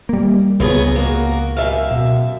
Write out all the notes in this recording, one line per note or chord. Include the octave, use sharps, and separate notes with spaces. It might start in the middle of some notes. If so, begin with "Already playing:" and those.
G3 A#3
C#2 F#3 B3 G#4
A#3 F#4
F#2 E5 F5
B2